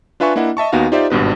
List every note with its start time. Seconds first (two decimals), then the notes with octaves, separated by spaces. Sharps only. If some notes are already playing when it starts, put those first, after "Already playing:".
0.20 D4 F4 B4 E5 G#5 C#6
0.36 A#3 D4 E4 D#5 F#5
0.57 D#5 E5 A5 C#6
0.72 D#2 B3 D#4 F#4 F5
0.92 D#4 F4 G4 C5 D5 E5
1.10 G#1 G2 B2 B4